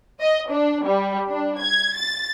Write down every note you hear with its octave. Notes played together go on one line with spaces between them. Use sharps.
D#5
D4
G3
D4
G#6
A6